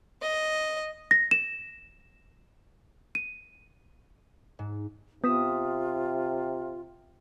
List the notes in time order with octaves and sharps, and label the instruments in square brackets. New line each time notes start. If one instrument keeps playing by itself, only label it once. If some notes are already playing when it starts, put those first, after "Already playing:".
[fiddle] D#5
[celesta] A#6
E7
D#7
[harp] G#2
[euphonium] C3 [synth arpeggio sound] B3 [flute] F4 [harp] D#6 B6 E7